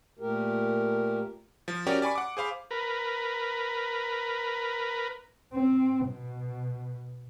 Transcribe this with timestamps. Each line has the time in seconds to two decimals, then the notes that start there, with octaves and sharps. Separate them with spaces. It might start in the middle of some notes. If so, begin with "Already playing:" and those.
0.19 A#2 A3 G4 A#4
1.68 F3
1.87 C#4 F#4 G4 A#4 D5 G5
2.02 D5 G#5 B5 C#6
2.15 F#5 D6
2.37 G#4 C5 F5 B5
2.71 A#4 B4
5.53 C4
6.06 B2